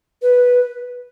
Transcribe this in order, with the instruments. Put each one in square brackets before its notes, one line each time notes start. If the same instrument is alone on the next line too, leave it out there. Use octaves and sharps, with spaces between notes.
[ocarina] B4